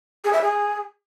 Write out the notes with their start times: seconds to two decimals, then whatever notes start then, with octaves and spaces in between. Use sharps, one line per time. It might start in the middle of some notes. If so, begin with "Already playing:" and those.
0.24 G#4
0.33 E5
0.42 G#4